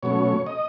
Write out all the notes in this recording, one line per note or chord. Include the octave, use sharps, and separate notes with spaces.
B2 F#3 A3 C#4 C#5
D#5